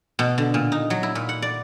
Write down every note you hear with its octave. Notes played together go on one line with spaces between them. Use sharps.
B2
D3
A#2
D#4
F#3
E4
A#2
F#5
D5